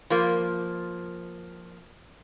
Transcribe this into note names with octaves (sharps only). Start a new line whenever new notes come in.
F3 A#3